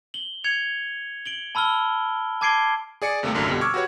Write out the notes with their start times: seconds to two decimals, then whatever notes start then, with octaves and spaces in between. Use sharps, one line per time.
0.14 F#7 G7
0.44 G#6 C#7 F7
1.26 D7 F#7 G7
1.55 A5 B5 E6 F6 G7
2.41 A5 D6 G#6 C7 D7 G7
3.02 G#4 D5 C#7
3.23 D#2 C3 G3 A3 A#3
3.34 A1 F#2 D3 A4 A#4
3.49 F2 B2 D3 G3
3.61 C#6 D6 E6 F6 G#6
3.74 F#4 G4 B4 C#5